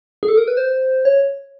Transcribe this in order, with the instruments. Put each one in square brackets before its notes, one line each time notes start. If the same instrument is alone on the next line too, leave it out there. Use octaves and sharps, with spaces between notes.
[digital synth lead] G#4
A4
A#4
B4
C5
C#5